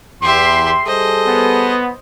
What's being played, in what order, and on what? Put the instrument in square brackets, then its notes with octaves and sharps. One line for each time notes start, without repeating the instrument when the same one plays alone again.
[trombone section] E2 [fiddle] G4 E5 [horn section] C6
[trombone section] G3 G#4 A4 [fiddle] C5 D#5
[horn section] B3